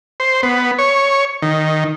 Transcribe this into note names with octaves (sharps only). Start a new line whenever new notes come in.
C5
B3
C#5
D#3